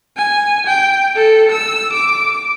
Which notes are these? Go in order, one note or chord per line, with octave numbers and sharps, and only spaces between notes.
G#5
G5
A4
E6
D6